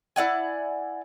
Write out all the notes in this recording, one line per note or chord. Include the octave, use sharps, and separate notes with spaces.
E4 D5 F#5 G#5